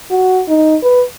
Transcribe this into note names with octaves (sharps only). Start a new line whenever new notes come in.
F#4
D#4
B4